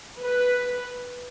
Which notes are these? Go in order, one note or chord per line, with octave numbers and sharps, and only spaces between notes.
B4